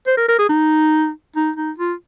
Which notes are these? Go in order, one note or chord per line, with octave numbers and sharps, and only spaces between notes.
C5
A#4
A#4
G#4
D#4
D#4
D#4
F4